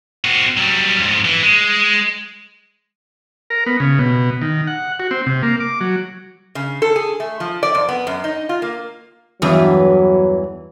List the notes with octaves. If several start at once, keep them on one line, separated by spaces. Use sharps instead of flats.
C4 F#4
F#3 G3
F2 G#2
E3
G#3
A#4
B3
C#3
B2
D#3
F#5
F#4
C4
C3
A#3
D6
F#3
C#3
A4
G#4
A3
F3
D5
F2
B3
F#2
D#4
F4
A#3
E2 G2 E3 F#3